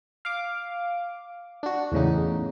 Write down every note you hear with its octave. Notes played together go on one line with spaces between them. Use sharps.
F5 D6
D4 F#4
E2 A2 C#3 D#4